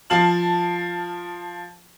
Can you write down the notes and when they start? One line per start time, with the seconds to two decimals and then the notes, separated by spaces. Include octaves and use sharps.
0.10 F3 F5 A5 F#7